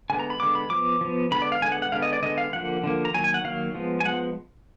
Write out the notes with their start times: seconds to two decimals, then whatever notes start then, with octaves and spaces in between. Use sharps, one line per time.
0.10 D3 G#3 B3 G#5
0.19 A#5
0.30 B5
0.40 D3 G#3 B3 D6
0.55 B5
0.70 F3 B3 D6
1.01 F3 B3
1.31 D3 G#3 B3 B5
1.42 D5
1.52 F5
1.61 D3 G#3 B3 G#5
1.72 F#5
1.82 F#5
1.92 D3 G#3 B3 F5
2.02 D#5
2.13 D5
2.23 D3 G#3 B3 D#5
2.38 F5
2.53 D3 F3 A#3 F#5
2.84 D3 F3 A#3
3.05 A#5
3.14 D#3 F#3 A#3 G#5
3.24 G#5
3.34 F#5
3.44 D#3 F#3 A#3 F5
3.75 F3 G#3 B3
4.00 G#5
4.05 F3 G#3 B3 F#5